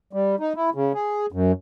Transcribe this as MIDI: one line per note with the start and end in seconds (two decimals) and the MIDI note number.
0.13 0.36 55
0.40 0.53 63
0.56 0.70 64
0.75 0.92 49
0.94 1.26 68
1.32 1.52 42